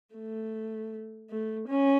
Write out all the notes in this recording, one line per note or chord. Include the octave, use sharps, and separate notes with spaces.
A3
A3
C#4